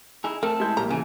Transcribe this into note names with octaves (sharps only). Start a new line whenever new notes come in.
D#4 E4 G#4
A3 C4 A4 A#4
G#3 E4 G6
A#1 G3 A#3 A#5
C#3 E3 F3 G#5